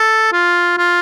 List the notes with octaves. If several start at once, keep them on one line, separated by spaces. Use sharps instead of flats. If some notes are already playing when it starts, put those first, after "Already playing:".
Already playing: A4
F4
F4